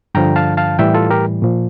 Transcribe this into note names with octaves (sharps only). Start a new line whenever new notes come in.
G2 D3 F3 G5 A#5
F5 A5
F5 A5
A2 E3 G3 E5 G5
F4 A4
G4 A#4
A#2 F3